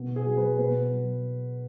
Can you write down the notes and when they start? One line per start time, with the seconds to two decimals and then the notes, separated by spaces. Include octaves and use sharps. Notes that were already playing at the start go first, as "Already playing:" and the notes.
Already playing: B2
0.16 G#4
0.26 F#3
0.37 B4
0.58 B2 B4
0.91 F#3